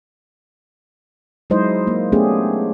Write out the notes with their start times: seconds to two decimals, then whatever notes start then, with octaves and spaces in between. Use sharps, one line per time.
1.50 F#3 G#3 D#4 E4 C5 D#5
1.87 A#3
2.12 A3 B3 C#4 D4 G4 G#4